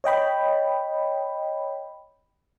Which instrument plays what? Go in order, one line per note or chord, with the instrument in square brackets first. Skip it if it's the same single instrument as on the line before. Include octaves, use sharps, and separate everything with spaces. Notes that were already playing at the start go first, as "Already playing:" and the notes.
[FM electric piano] C#5 D#5 G5 B5